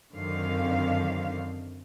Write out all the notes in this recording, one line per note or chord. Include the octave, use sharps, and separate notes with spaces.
F#2 D3 D#3 C4 F5